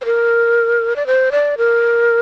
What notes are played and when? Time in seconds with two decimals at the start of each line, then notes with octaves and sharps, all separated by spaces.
0.01 C5
0.05 A#4
0.96 D5
1.07 C5
1.32 D5
1.58 A#4